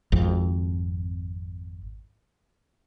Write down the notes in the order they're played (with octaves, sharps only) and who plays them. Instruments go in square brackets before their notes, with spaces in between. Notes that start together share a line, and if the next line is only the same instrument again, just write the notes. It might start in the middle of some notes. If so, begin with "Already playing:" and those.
[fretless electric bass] G#1 F2